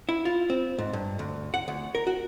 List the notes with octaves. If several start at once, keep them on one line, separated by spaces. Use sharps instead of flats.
E4
F4
C4
G#2
G2
D2
F#5
D2
A#4
F#4